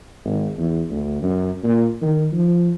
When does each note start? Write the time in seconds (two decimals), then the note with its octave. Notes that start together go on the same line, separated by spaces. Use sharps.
0.24 G#1
0.58 E2
0.89 D2
1.22 F#2
1.64 A#2
2.02 D#3
2.32 F3